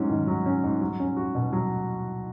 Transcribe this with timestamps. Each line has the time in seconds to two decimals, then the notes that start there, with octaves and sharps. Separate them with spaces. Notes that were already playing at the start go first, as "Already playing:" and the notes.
Already playing: G#2 F#3 C#4
0.10 D#3
0.27 F#3
0.46 C#4
0.63 G#2
0.81 F#3
1.00 C#4
1.17 F#4
1.35 B2
1.53 F#3